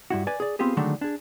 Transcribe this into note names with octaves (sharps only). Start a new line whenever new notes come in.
G2 E4 F#4
B4 D5 G#5
G#4 D5
B3 C4 F4 G4 G#4
D3 D#3 F#3 G#3 A3 D4
D4 G#4